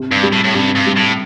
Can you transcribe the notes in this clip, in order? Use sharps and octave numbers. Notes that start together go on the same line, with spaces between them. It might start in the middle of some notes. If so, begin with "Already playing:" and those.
Already playing: C3
G2
G3
A2
A2
G2 C3
G2
G3
A2